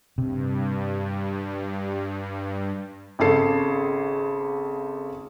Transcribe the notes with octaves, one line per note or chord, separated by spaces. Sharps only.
G2 C3
G#1 C#3 G#4 A4 C7